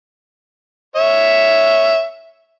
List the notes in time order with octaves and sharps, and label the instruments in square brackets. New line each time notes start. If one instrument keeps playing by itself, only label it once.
[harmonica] C#5 E5